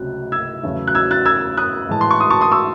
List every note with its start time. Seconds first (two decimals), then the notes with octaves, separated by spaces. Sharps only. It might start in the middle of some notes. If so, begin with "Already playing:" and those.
Already playing: C#2 C3 F#3 A3 F#6
0.32 E6 G#6
0.63 E2 C#3 F#3 A3
0.87 F#6
0.95 E6 G#6
1.11 F#6 A6
1.26 E6 G#6
1.57 D#6 F#6
1.89 A2 E3 G#3 A5
2.01 C6
2.11 C#6
2.20 C6 D#6
2.30 A5 C#6
2.41 C6 D#6
2.52 C#6 E6